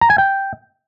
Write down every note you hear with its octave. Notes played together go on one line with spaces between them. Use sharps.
A#5
G#5
G5